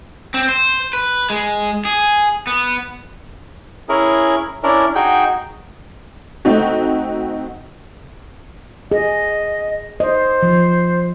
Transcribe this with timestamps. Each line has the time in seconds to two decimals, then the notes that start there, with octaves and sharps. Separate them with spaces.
0.34 C4
0.49 C5
0.93 B4
1.30 G#3
1.85 G#4
2.47 B3
3.89 C#4 E4 G#4 A#4
4.63 C#4 D4 E4 A#4
4.95 D#4 F#4 G#4 G5
6.45 A3 C4 D#4 F#4
8.91 G#4 D#5
10.00 C5 D#5
10.43 F3